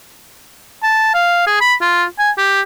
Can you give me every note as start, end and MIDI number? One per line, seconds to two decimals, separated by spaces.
0.83 1.10 81
1.14 1.42 77
1.46 1.56 68
1.61 1.74 83
1.81 2.04 65
2.19 2.30 80
2.38 2.61 67